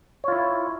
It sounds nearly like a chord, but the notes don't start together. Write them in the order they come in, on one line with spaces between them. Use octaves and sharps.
C#5 F4 E4